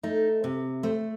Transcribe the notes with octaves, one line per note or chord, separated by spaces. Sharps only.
A3 D#4
C3
A3 C5